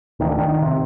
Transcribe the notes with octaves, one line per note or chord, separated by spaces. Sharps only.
D2 D#3
D3
D#3
D#3
C3